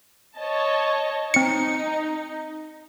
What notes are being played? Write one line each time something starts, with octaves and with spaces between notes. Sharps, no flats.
C#5 D#5 A5
C4 D#4 C#7